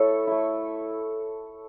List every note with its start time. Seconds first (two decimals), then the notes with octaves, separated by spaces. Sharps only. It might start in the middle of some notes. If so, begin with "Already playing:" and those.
Already playing: A3 E4 A4 C#5
0.27 A3 E4